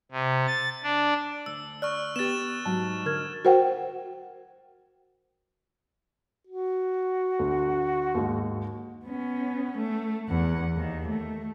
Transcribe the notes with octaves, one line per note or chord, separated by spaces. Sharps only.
C3
A6
D4
D2 E6
D5 C#6 F6 F#6
B3 G4 A6 E7
G#2 F#3 D#4 A5
D3 A#4 F6 G#6
F#4 A#4 C5 F#5 G5
F#4
D2
D#2 G#2
B3 C#4
A3
E2 F#5
D#2 D#3
A3